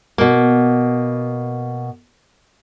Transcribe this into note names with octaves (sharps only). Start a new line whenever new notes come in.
B2 A#3